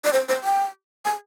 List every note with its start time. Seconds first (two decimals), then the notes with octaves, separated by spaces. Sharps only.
0.05 D5
0.13 C5
0.29 C5
0.44 G5
1.05 G#5